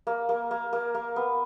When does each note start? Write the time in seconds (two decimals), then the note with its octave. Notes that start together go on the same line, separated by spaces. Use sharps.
0.07 A#3
0.29 A#3
0.51 A#3
0.73 A#3
0.95 A#3
1.16 B3